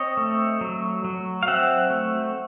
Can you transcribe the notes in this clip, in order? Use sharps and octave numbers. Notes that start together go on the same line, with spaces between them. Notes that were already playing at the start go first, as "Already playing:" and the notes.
Already playing: C4 C#5 D#5
A3
F#3
F#3
F5
C4 E5 F#5
A3